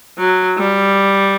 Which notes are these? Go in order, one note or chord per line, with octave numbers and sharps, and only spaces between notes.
F#3
G3